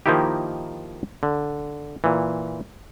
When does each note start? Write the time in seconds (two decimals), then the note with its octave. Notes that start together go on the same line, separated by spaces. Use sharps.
0.06 D#3 F3 A#3 D#4 E4 G4
1.23 D3
2.04 A#2 E3